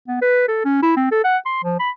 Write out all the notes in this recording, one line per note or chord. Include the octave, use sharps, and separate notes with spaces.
B3
B4
A4
C#4
E4
C4
A4
F#5
C6
F3
B5